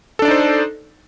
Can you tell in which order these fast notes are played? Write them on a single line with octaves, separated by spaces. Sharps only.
A4 D4 D5 D#4 C5